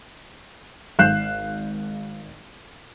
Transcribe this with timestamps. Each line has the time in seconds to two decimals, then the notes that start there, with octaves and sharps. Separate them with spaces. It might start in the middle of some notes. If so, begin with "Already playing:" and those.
0.99 G#1 F5 F#6 G6 C7 E7